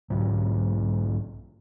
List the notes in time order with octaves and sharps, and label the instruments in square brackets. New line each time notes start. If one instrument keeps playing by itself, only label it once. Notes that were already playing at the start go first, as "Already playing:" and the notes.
[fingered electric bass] B1 G#2 F#3